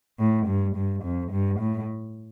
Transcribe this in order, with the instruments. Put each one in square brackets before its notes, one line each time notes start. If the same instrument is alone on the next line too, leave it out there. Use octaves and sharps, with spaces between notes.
[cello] A2
G2
G2
F2
G2
A2